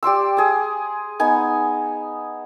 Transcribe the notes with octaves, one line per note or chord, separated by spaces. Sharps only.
G4 D5 C6 E6
G#4 D#6
B3 D#4 G#5